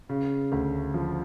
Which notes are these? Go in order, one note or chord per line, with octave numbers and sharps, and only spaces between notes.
C#3
D2
F3